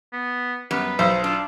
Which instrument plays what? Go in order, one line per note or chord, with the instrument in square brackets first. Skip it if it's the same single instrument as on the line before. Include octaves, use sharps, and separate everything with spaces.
[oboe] B3
[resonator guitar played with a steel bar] F#2 G3 B3 [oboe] B4
[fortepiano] B1 [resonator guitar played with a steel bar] C5
[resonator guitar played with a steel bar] D4 [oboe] F4